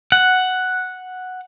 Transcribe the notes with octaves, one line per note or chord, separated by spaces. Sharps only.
F#5